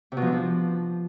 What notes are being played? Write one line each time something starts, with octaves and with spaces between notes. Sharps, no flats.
C3
B2
F3
D4
F3